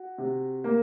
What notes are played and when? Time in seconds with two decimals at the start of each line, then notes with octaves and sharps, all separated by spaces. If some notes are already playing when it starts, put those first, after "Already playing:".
Already playing: F#4
0.18 C3
0.64 A#3